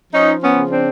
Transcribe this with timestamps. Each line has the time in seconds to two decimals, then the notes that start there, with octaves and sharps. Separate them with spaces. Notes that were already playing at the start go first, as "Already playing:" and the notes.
0.13 F3 C#4 D#4
0.42 B3 C#4
0.56 C#3
0.71 C4 D4